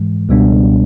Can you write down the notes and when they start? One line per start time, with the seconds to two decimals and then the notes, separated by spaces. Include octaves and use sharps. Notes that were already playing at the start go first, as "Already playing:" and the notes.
Already playing: G#2 E3 G#3
0.29 C#2 B2 G3 B3 D4